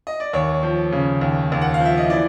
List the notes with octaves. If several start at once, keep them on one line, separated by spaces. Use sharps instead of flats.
D#5
D5
D#2 C#5
F3
C#3
D#2
D#2
F#5
F5
F3
E5
D#5
E3 D5